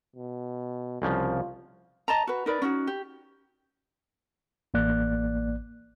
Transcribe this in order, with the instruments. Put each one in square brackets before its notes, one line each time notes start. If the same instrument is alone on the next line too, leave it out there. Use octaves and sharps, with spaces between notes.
[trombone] B2
[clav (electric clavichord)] C2 C#3 F3 [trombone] F4
[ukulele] D#5 A5 A#5
F#4 B4
D#4 A#4 B4 D5
C#4 D#4 E4 F#4
G4
[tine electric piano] A1 A#3 D5 F#6